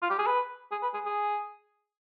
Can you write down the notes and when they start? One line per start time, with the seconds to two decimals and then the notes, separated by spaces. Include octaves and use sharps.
0.02 F4
0.10 G4
0.19 G#4
0.26 B4
0.72 G#4
0.83 B4
0.94 G#4
1.05 G#4